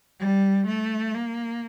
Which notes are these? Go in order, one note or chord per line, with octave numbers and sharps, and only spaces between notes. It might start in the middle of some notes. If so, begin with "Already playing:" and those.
G3
A3
A#3